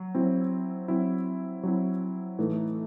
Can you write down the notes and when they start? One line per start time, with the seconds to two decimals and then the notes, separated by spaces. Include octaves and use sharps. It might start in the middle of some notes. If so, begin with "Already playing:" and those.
Already playing: F#3
0.15 F#3 C4 E4
0.88 F#3 C4 E4
1.63 F#3 C4 E4
2.39 A2 E3 A3 D#4 A4